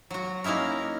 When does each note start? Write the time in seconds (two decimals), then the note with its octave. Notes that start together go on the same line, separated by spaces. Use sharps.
0.11 F#3 F#4
0.44 A#3 C#4 D#4 E4 A#4